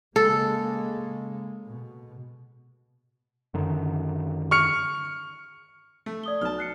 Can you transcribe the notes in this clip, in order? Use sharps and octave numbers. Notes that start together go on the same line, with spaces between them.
C#3 G#3 A#3 A4
B2
F#2 D3 D#3
C#6 F6 C#7
A3
D5 D#6 G7
B1 A5 F6
F#6 C7 C#7